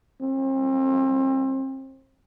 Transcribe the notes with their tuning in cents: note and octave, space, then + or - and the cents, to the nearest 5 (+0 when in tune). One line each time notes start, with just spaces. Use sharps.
C4 +35